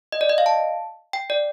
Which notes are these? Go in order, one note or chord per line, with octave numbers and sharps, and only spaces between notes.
D#5
D5
D#5
F5
A5
G5
D5